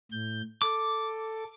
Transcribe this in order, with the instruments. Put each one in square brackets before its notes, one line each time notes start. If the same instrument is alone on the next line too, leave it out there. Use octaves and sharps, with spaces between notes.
[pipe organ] A2 G6
[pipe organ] A4 [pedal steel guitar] D6